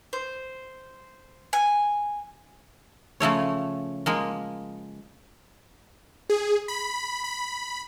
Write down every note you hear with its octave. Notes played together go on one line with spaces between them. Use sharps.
C5
G#5
C#3 F3 A3 C#5
F3 G#3 A#3
G#4
B5
B5